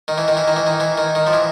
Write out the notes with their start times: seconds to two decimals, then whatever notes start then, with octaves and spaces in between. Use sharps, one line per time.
0.08 D#3
0.18 E3
0.28 D#3
0.37 E3
0.48 D#3
0.56 E3
0.67 D#3
0.80 E3
0.98 D#3
1.15 D#3
1.27 F3
1.33 E3